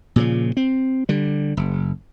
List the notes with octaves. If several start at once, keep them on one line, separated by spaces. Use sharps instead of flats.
A#2 C#3 F3
C4
D3 G3
F#1